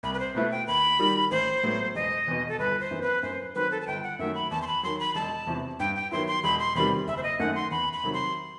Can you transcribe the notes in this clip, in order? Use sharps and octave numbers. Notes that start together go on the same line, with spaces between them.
C2 B5
B4
C5
B2 A3 E4 B4
G5
D#2 B5
D#3 G3 D#4
A1 C5
A2 F#3 B3
E1 D#5
E2 B2
A4
G1 B4
C5
F#2 E3 B3
B4
F#2 C5
D#3 F#3 C4 B4
A4
A5
G1 G5
F#5
F#2 D#3 F#3 A3 E5
B5
E2 A5
C6
B5
D#3 F#3 C6
B5
E1 A5
E2 C3 E3
G2 G5
G5
D#3 F#3 B3 E4 C6
C6
E1 B5
C6
E2 C3 D#3 G3 B5
F#1 E5
C5
D#5
F#2 D#3 A3 D#4 F#5
C6
E2 B5
B5
C3 D#3 F#3
C6